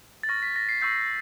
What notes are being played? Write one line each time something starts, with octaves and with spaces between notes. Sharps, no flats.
A6
C#6 F6 A#6
B6
A#6
C7
C#6 E6 G6 C7